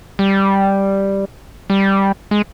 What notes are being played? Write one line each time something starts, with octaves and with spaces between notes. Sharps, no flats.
G3
G3
G#3